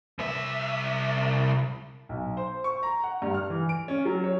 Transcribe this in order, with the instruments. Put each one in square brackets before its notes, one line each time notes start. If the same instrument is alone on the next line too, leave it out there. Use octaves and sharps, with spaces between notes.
[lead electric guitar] C2 E5
[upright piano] B1
C5
C#6
A#5
F#5
G2
F6
E3
D7
C#4
F#3
C#5